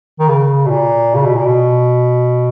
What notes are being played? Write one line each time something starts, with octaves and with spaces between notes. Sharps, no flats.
D#3
C#3
B2
A#2
C#3
B2
A#2
B2